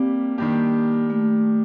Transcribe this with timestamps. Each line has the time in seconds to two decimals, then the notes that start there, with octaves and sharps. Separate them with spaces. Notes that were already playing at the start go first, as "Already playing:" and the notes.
Already playing: G3 A#3 C4 D4 G4
0.38 D#3 G3 A#3 D4 G4
1.10 A3